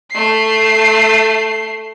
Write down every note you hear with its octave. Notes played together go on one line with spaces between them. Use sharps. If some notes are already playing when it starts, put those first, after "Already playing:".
A3 C7